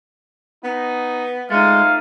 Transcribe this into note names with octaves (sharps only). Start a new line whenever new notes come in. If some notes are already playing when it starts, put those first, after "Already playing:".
B3 D#4
G#3 A3 D#4 F5